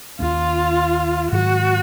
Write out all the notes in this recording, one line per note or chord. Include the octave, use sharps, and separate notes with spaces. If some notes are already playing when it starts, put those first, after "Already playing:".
D#2 D#3 A#3 C#4 F4
G#2 D#3 F#3 F#4